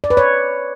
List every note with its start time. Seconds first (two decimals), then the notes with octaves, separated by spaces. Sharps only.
0.04 D5
0.10 B4
0.17 C#5